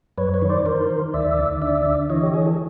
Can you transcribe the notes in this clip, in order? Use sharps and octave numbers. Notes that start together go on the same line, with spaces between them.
F#2 B4 C#5
B4 C#5
D#3
C5 D5
D#3 A#4 C5
D#3
D2 D5 E5
D2
D3 D5 E5
D3
E3 C#5 D#5
G4
E3 G#4
A4